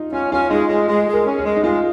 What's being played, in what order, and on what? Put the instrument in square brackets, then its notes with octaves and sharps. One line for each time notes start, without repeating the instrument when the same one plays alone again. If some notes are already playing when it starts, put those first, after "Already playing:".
Already playing: [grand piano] D#4 F4
[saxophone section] C#4 [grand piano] F4
[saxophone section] C#4 [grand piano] F4
[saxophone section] G#3 [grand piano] D#4
[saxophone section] G#3
G#3
G#3
[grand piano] A#4
[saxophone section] C#4
[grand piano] G#4
[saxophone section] G#3
[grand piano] D#4
[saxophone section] G#3 [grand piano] F4